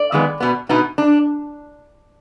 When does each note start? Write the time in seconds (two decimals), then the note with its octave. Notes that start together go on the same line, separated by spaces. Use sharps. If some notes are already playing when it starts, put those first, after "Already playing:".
Already playing: D5
0.12 F2 D#3 G#3 B3
0.40 B2 B3
0.69 B2 B3 D#4
0.98 D4